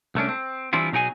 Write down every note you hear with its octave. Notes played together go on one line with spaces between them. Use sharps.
C2 A3 C#4 D4
C4
E3 G3 C4 D4 E4 F4
B2 F#3 D#4 G#4 G5 G#5